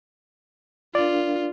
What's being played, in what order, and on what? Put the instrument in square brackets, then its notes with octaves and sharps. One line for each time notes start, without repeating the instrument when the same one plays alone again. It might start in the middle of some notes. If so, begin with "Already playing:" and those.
[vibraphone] D4 A#4 F5 [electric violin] F4 [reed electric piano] D5